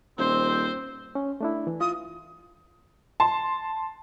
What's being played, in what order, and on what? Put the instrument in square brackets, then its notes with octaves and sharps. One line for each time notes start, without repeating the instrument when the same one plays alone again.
[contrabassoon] D#1 [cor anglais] C4 [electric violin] C5
[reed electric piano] C#4
A3 D4 E4
E3
[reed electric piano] F4 [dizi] D#6
[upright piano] A5 C6